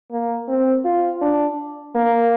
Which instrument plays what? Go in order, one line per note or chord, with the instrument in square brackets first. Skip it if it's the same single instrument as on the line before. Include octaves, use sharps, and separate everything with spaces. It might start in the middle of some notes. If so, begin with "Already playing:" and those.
[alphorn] A#3
C4
F4
D4
A#3